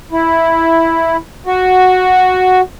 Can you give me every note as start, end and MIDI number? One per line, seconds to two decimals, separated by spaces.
0.12 1.17 64
1.46 2.61 66